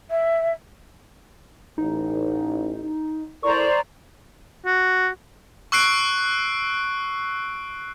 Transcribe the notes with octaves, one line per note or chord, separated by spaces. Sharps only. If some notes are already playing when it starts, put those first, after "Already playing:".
E5
A1 D#4
E4 A4 A#4 C5 D5 A#5 C#6
F#4
C#6 E6 F#6 C7 D7